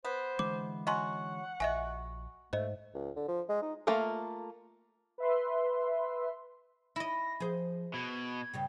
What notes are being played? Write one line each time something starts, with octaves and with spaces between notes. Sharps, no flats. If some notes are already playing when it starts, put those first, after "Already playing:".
B3 C5
D3 E3 G#3 D6
F#3 C#4 F#4 D#5 F#5 C6
A#1 F#4 D#5 E5 G#5
G#2 A3 C5 D#5
C#2
D3
F3
G#3
D#4
A3 A#3 F4 F5 A#5
B4 E5 C6
E4 D#5 A#6
F3 G#4 C5
B2 G#6
G2 C#3 G3